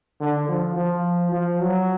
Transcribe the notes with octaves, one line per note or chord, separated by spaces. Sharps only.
D3
F3
F3
F3
F#3